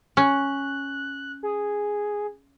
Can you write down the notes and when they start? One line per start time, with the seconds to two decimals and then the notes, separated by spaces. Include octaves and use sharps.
0.17 C#4 F#6
1.43 G#4